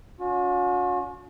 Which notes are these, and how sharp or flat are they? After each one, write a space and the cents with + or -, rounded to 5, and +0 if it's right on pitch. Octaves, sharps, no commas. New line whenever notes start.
C#4 +40 F#4 -45